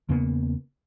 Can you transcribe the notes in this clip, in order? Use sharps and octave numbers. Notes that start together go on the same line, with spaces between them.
E2 C#3 A#3 B3